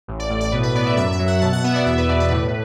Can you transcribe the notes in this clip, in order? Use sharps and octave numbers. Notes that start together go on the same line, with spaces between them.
A1
D5
A2
D5
B2 B4
B4
B3 D5
E5
F#2 E5
E5
F#3
F#5
B2 A5
F#5
B3 E5
D5
E2 E5
B4
B2 D5
B4
A2